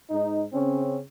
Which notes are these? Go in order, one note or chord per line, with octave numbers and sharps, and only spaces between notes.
G#2 D#4
C#3 C4 C#4